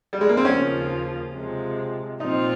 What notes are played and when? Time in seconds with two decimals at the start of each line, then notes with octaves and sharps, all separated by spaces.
0.13 G3
0.21 G#3
0.29 A#3
0.37 C4
0.45 D#2 C#3 F3 A#3 C#4 F4
1.33 C3 F3 G#3
2.20 A#2 F3 C4 D#4 F4